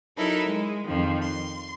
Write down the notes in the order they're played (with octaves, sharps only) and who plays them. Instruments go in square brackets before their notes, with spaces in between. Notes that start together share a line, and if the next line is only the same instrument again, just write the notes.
[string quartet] F#3 D#4 E4 A4 A#4
G#3
F2 D#3 F3
C6